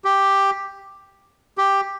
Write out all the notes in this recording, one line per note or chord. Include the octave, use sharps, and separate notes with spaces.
G4
G4